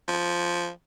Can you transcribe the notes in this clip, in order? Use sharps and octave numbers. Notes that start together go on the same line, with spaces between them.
F3